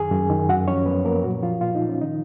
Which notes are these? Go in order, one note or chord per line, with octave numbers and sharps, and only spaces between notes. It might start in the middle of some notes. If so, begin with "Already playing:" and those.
Already playing: F#2 D#3 G#4 G#5
F#2
D#3
F#2 F#4 F#5
F3 C#4 C#5
F#2 B3 B4
F3 A#3 A#4
A#2 F#3 F#4
F3 F4
A#2 F4
D#4
F3
C#4
D#3 D#4